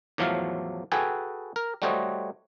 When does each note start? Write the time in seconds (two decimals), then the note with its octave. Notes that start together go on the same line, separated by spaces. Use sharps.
0.18 E2 A2 F3 F#3 A3 F5
0.92 F#4 G#4 A4 B4 G5 G#5
1.56 A#4
1.82 G3 A3 F#4 C5 C#5 D#5